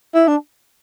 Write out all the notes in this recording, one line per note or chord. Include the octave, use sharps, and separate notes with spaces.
E4
D4